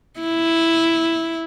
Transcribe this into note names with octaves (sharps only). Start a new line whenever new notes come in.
E4